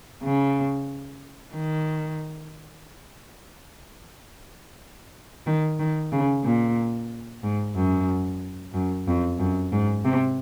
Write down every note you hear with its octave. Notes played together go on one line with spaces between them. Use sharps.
C#3
D#3
D#3
D#3
C#3
A#2
G#2
F#2
F#2
F2
F#2
G#2
C3